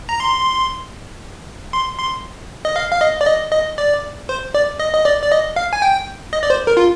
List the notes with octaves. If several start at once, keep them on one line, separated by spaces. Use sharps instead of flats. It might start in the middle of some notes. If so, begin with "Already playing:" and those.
A#5
C6
C6
C6
D#5
F5
F5
D#5
D5
D#5
D#5
D5
C5
D5
D#5
D#5
D5
D5
D#5
F5
G#5
G5
D#5
D5
C5
A#4
F4